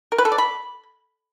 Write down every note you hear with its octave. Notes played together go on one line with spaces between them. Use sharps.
A#4
B4
A4
D5
B5